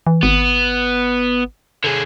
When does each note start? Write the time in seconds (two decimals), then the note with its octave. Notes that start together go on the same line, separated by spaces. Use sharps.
0.07 E3
0.23 G#1 B3
1.84 D3 G#4